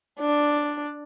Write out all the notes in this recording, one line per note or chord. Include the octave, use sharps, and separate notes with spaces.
D4